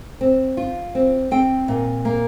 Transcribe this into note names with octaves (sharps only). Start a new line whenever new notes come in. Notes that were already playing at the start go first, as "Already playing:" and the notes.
C4
F4
C4
C4 G5
A#2
A#3